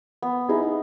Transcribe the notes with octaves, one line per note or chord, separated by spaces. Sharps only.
B3
D#4 E4 G#4